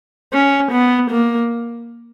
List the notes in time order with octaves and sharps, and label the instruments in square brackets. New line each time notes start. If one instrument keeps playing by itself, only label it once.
[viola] C#4
B3
A#3